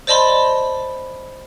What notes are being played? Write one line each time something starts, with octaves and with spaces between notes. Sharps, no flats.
C5 D5 D#5 A5 B5 C6